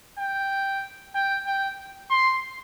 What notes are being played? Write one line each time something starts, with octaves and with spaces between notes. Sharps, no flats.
G5
G5
G5
C6